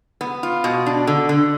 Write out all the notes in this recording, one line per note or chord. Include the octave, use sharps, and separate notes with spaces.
B3
F4
B2
D4
D3
D3